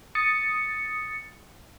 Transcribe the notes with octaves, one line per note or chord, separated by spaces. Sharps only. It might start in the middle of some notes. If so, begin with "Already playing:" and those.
D#6 A6 C#7